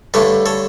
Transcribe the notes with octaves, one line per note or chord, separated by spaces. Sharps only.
G2 D3 A3 A4 C#5
A4 C#5